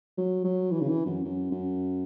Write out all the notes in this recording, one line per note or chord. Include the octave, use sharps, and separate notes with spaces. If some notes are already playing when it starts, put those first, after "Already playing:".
F#3
F#3
E3
C#3
E3
F#2
F#2
F#2